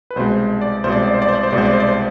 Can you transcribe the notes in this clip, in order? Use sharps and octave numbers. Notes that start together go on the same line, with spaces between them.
B4
C2 B2 G#3 C5
D5
C2 B2 G#3 C5
D5
C5
D5
C5
D5
C5
D5
C5
C2 B2 G#3 D5
C5
D5
C5
D5
C5